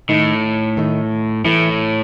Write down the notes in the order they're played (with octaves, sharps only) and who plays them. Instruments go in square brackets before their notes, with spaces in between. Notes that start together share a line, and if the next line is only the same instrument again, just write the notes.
[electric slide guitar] A2 [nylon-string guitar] D#3 A3 D#4
[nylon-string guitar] D#3 A3 D#4
[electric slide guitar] A2 [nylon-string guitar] E3 A3 E4 A4